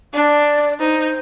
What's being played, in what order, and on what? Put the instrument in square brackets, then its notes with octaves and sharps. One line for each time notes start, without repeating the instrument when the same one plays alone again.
[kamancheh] D4 [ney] D5
[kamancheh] D#4 [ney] C5